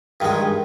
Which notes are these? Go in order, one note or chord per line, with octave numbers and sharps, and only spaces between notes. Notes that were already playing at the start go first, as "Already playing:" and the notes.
G2 D#3 G#3